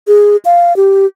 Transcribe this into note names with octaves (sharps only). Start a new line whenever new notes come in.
G#4
F5
G4